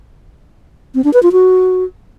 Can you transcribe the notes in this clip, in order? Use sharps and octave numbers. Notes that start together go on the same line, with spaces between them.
C4
D4
B4
F4
F#4